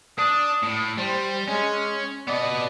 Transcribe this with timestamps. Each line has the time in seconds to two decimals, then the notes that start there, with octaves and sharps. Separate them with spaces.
0.19 D4 D#6
0.63 A2
0.98 G3 C5
1.48 G#3 C#4
2.28 B3 D5 D#5